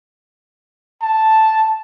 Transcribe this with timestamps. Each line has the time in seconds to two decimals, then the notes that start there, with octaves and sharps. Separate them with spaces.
1.02 A5